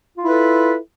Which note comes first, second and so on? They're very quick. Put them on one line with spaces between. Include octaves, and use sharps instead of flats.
F4 E4 B4 A4